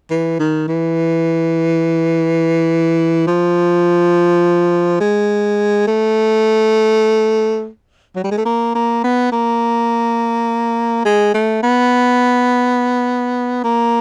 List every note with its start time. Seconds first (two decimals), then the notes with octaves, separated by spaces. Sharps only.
0.10 E3
0.39 D#3
0.68 E3
3.27 F3
5.00 G#3
5.87 A3
8.16 F#3
8.24 G3
8.31 G#3
8.38 A3
8.45 A#3
8.75 A#3
9.04 B3
9.32 A#3
11.05 G#3
11.34 A3
11.63 B3
13.64 A#3